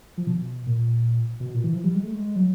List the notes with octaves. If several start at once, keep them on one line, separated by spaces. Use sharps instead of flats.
F3
B2
A#2
B2
A#2
E3
F3
G3
G#3
A3
G#3
F#3